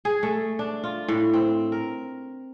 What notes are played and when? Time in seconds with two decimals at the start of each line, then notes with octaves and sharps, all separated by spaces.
0.05 G#4
0.23 A3
0.59 D4
0.84 F4
1.08 A2
1.34 C4
1.72 A#4